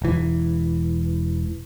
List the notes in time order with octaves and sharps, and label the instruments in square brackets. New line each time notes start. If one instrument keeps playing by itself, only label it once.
[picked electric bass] E1 E3